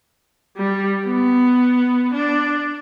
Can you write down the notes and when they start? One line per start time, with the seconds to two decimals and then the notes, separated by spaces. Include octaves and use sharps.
0.57 G3
1.05 B3
2.14 D4